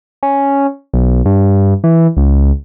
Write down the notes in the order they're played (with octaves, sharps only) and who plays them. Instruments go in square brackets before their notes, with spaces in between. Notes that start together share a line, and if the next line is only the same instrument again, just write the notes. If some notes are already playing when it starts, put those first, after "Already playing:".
[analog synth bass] C#4
B1
G2
E3
C#2